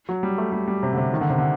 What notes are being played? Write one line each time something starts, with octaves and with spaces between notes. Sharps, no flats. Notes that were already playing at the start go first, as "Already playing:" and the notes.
F#3
G3
A3
G3
G3
C3
D3
C3
D#3
D3
C3
D3